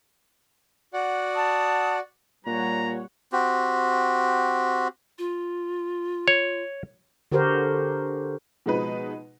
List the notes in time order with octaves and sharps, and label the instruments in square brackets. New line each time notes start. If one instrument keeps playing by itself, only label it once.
[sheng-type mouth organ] F#4 D5 F#5
[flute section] A5 D#6
[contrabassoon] A#2 [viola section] G3 C#5 F#5 [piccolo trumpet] A#5
[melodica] C4 F#4 G4
[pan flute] F4
[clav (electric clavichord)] C#5
[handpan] D3 F#4 G4 A#4 C5
[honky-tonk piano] B2 F3 G#3 D#4 B4